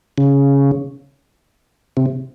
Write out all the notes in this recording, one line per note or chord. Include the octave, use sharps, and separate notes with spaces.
C#3
C3